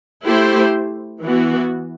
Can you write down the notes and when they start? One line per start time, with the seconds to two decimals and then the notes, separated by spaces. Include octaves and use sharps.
0.24 A3 E4 G4 C5
1.22 E3 B3 F#4